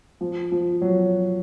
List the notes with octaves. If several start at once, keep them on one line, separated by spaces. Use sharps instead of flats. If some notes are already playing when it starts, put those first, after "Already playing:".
F3
F3
F#3